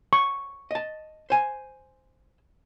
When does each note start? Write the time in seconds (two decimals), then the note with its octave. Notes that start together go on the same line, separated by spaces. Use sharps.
0.13 C#6
0.71 D#5 A5
1.30 C5 G#5